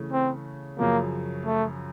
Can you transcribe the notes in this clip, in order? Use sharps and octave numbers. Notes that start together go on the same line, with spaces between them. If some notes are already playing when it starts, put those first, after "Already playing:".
Already playing: C#3 E3 A3
C4
F#2 C#3 F3 A#3
A3